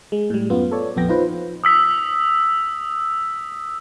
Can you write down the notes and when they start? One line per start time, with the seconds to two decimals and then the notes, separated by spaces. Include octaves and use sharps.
0.12 G#3
0.30 A2 G3
0.50 F#2 B3 F4
0.71 A4 C#5 D5
0.96 A#1 F2 B3 G5 A#6
1.09 D#4 F4 B4 C5
1.64 D#6 E6 B6